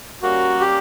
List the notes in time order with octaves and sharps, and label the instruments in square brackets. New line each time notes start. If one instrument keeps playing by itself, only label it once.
[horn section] G3 A#3 C#4 [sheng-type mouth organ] F#4
[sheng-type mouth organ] G4